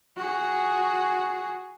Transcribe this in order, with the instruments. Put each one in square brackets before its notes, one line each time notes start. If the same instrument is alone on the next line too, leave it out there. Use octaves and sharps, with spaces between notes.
[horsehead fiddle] F#4 G#4